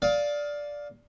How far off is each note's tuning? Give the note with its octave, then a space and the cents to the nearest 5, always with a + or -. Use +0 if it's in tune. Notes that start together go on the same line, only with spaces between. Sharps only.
D5 -5 F5 +15 D#6 +35